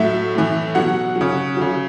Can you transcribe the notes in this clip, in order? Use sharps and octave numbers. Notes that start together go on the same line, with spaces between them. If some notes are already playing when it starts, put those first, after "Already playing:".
Already playing: A2 F#3 E5
A2 E3
B2 F#3 F#5
C#3 F#3
C#3 F#3